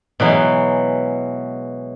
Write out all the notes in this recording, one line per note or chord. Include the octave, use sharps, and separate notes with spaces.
B2 E3 F#3 G#3